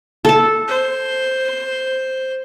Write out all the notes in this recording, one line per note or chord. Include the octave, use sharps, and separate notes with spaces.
A4 A5
C5